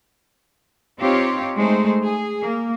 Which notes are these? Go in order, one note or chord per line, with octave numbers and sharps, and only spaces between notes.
C4 D#4 F4 G4 C#5
G#3 A3 D#4 C5
G#4
A#3